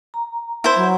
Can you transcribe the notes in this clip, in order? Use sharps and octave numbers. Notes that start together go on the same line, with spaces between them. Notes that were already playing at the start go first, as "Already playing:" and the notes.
A#5
E4 C5
F#3